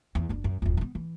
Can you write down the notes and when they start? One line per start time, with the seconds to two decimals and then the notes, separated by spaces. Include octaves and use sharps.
0.15 E2
0.29 F#1 D4
0.44 F#2
0.62 D1 F2
0.77 A3 B3
0.95 E3